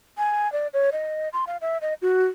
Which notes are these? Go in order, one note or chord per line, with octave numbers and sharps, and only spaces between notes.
G#5
D5
C#5
D#5
C6
F5
E5
D#5
F#4